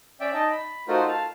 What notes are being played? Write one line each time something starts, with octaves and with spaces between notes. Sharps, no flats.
C#4 D5 E5 G5
D#4 D#5 A5
B5
A3 D#4 F4 F#4 A#4 C5
F5 A5